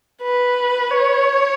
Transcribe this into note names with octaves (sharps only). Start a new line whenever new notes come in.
B4
C#5